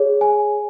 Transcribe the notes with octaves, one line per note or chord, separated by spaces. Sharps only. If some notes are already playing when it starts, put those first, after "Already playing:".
Already playing: G#4 C#5
G#5